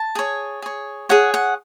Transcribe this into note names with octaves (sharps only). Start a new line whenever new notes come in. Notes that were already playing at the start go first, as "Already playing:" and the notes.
Already playing: A5
G#4 C#5
G#4 C#5
G#4 C#5 F#5
F#5